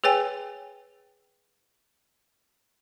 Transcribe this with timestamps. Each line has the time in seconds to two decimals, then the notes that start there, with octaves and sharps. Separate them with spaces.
0.04 G#4 B4 C#5 G5 G#5